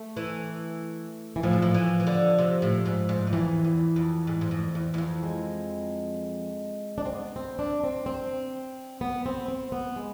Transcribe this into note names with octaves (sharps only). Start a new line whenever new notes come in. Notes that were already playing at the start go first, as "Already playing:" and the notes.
Already playing: A3
E3
E3
A2 F3
G#2
A2
E3
E3
D3
C3
A2
G#2
G#2
E2
F2 E3
E2
F2
G#2
G#2
F2
E2
E2
F2
G#3
D4
C4
B3
C4
D4
C4
C4
B3
C4
C4
B3
G#3